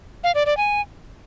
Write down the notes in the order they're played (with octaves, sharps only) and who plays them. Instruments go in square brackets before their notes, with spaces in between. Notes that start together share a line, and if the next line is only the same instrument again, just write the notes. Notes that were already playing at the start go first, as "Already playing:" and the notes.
[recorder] F5
D5
D5
G#5